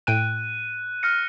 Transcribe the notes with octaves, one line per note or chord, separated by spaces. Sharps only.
A2 G5 F#6 D7 D#7
F6 A#6 C#7